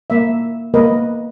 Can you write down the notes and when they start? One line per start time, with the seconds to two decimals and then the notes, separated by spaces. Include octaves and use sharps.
0.10 A#3 E5
0.74 A#3 B3 A#4 B4 D#5